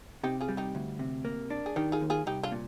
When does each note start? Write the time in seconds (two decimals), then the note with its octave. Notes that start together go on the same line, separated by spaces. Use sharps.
0.23 C3 D#4 G4
0.41 F4 G#4
0.49 G3
0.57 D#4 G4
0.75 D2
0.99 C3
1.25 A#3
1.50 D4
1.66 G#4
1.76 D#3 D#4 G4
1.92 F4 G#4
2.01 D#2
2.10 F4 G#4
2.26 C2 D#4 G4
2.43 D4 F4
2.52 A#2